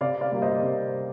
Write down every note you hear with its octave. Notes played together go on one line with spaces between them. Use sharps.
C3 D5 F5
D5 F5
G3 A#3
C5 D#5
C3